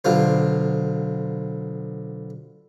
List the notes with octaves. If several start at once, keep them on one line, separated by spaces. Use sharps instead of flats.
B1 D3 F4 C5